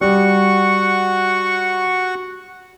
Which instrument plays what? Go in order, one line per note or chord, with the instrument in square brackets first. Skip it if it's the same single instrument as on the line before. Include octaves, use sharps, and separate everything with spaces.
[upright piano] G3 [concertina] F#4 F#5 C#6